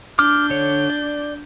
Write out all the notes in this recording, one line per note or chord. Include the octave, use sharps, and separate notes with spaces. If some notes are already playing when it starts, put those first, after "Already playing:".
D4 D6 F6 G6
D3 C#5
D5